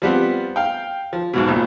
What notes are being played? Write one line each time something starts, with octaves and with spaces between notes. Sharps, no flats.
F3 G3 B3 C4
F5 G5
F3
B1 G#2 B2
G#1 C#2 A#2